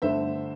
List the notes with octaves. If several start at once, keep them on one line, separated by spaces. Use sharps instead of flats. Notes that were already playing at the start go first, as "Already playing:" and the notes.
G1 G2 D3 A3 C5 E5